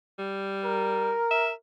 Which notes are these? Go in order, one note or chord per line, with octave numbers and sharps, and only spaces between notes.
G3
A#4
E5